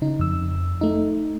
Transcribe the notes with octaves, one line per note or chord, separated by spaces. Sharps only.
C#3 D#4
F2 E6
A3 D#4